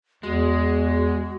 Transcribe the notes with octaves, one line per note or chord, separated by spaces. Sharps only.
E2 G#3 F#4